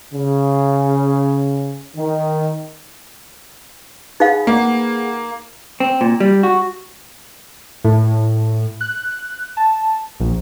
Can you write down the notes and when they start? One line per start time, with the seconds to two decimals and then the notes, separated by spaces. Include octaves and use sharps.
0.14 C#3
1.96 D#3
4.20 D#4 G#4 B4 F5 F#5
4.47 A#3
5.80 C4
6.01 A#2
6.20 G3
6.43 F#4
7.84 A2
8.81 F#6
9.57 A5
10.20 A#1